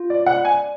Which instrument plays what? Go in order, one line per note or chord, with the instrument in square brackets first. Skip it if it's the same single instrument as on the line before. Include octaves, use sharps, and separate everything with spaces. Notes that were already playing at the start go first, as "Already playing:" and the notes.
Already playing: [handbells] F4
[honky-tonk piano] D5
[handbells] D5 [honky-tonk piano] F#5
[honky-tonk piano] G#5